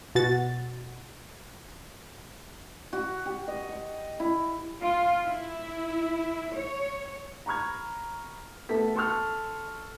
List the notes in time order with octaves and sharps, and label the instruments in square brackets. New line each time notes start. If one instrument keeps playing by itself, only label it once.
[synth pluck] B2 F#4 A6
[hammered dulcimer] F#4
G4
D#5
C#6
E4
[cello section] F4
E4
C#5
[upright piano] A#5 B5 C#6 F6 G#6
A3 B3 A4 B6
A4 C6 C#6 E6 F6